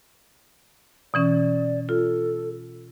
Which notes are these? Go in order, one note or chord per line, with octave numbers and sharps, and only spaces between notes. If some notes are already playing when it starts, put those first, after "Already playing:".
B2 E3 C#4 D5
F4 A4